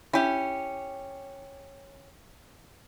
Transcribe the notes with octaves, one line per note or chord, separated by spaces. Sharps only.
C#4 E4 G4